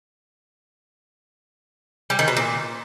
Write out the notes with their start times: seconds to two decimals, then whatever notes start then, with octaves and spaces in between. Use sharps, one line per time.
2.10 G3
2.19 D#3
2.28 B2
2.37 A#2